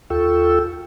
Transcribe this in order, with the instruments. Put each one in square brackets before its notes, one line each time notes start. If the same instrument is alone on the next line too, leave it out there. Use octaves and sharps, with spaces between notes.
[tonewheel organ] D#2 F4 A4 G5 C#6 E6